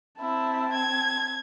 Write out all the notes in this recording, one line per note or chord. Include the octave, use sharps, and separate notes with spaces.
C4 E4 A5
G#6